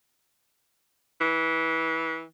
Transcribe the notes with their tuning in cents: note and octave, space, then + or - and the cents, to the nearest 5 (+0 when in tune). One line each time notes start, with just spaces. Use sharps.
E3 -20